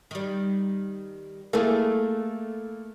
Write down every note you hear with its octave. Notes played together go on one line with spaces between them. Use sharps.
D#3 G3
A3 A#3 E4 G#4 A4